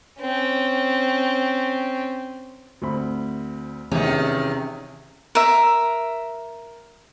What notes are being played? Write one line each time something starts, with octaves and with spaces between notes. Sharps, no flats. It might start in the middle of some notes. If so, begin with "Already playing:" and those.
C4 C#4
D2 C4 B5
E2 C3 D#3 C#4
A#4 E5